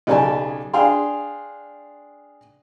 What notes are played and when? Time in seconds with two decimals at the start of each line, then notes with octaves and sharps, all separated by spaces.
0.07 B1 C#3 G4 D5 G#5 A5
0.74 D4 G#4 F5 G5 C6